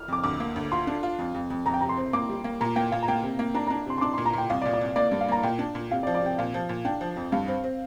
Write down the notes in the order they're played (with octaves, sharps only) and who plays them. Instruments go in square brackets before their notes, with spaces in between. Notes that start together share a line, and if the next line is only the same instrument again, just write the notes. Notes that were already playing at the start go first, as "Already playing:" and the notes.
Already playing: [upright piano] F6
[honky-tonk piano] F2 [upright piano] D6
[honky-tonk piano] D2 [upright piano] D6
[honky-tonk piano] A#3
D2
[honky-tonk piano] F4 [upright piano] C6
[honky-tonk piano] D4
F4
F2
F2
F2
[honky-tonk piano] F2 [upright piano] A#5
[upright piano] G5
[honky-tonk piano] C3 [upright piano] A#5
[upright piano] C6
[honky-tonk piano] C4
[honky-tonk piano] A#3 [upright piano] D6
[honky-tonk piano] G3
A#3
[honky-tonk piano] A#2 [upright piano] A#5
[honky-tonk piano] A#3 [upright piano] G5
[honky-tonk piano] A#2 [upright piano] F5
[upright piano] A#5
[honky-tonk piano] A#3 [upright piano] G5
[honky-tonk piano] C3
A#3
[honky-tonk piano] D4 [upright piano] A#5
[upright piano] A#5
[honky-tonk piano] D4
[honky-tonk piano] C3 [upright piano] C6
[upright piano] C6
[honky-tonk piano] D4 [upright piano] D6
[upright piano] C6
[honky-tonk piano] A#2
[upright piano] A#5
[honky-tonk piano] A#2 [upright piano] G5
[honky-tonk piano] C2 [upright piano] F5
[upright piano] D5
[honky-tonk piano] A#2
[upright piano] D5
[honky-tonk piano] C2
[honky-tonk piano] A#3 [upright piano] D5
[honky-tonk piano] G2
[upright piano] F5
[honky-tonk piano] A#3 [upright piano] A#5
[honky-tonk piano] A#2 [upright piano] G5
[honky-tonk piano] D4
A#2
[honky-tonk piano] C3 [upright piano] F5
[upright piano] D5
[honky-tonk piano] F3
[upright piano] D5
[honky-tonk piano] C3 [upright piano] G5
[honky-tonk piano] A#2 [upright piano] F5
[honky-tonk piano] F3
A#2
[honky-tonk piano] D4 [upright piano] G5
[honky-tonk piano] F3
F2
[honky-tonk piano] G2 [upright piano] F5
[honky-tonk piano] C4
C4